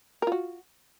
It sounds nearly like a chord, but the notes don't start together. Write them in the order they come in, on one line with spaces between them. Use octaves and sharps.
A#4 F4 F#4